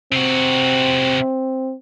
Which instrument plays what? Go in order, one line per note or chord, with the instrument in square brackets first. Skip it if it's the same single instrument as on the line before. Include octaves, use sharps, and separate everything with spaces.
[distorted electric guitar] C3 F#4 [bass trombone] C4